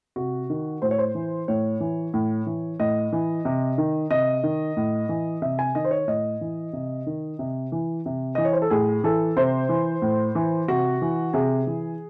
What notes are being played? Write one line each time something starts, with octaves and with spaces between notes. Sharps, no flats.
C3 F#4
D#3
A2 C5
C#5
C5
E3
A2 C#5
E3
A2
E3
A2 D#5
E3
C3
D#3
C3 D#5
D#3
A2
E3
C3 E5
G#5
D#3 D#5
C5
C#5
A2 D#5
E3
C3
D#3
C3
E3
C3
E3 D#5
C#5
C5
A4
A2 G#4
E3 A4
C3 C5
E3
A2
E3
C3 F#4
E3
C3 G#4
E3